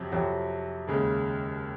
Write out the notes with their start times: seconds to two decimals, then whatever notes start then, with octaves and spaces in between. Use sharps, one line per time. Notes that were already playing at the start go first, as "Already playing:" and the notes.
Already playing: F2 C3 F#3
0.12 F2 C3 F#3
0.87 D#2 C#3 G#3